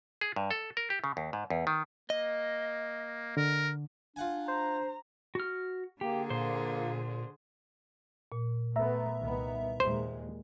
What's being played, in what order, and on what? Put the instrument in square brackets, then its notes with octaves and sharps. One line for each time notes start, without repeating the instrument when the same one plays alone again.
[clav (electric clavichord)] G#4
G2
A4
A#4
G4
C#3
D#2
G#2
E2
D#3
[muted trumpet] A#3 [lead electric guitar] D#5
[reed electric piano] D3 [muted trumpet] A#4
[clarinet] D4 [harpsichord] F4 F#5 G#5
[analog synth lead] C5 [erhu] A#5
[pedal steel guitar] F#4 F6
[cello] D3 G#4 [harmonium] A#3 [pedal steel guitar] G4
[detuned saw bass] A#2 [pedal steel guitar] C5
[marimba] A#2
[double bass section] A3 B3 [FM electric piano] E5 A#5
[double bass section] C2 D#3 B3
[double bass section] D#2 A#2 G#3 [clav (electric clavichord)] C5